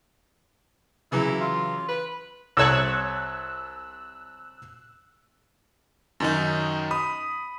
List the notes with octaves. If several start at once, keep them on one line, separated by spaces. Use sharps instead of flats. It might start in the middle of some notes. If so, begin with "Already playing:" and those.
C#3 E3 F#3 E4
F4
B4
C2 A4 C#5 E6 F#6
F#2 D#3 D#4
B5 D#6